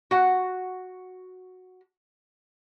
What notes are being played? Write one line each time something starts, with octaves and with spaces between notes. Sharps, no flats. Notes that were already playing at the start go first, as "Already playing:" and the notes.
F#4 F#5